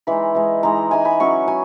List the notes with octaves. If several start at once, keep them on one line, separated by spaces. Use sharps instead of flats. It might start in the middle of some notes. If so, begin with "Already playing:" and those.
E3 G#3 D#4 B5
E3 G#3 D#4
E3 G#3 D#4 A#5
E3 G#3 D#4 G#5
B5
F#3 C#4 E4 C#6
F#3 G#5